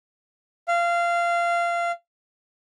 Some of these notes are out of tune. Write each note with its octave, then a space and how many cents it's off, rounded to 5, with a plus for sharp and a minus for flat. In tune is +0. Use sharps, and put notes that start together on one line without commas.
F5 -20